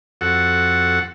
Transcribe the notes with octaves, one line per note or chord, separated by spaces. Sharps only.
F2 F#4 A4 F#5